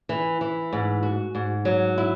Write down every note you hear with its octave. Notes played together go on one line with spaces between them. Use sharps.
E3
E3
G#2
F#4
G#2
F#3
E4